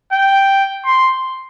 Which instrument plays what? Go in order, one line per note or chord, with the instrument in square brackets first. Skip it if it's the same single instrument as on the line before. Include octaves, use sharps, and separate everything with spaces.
[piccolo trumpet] G5
C6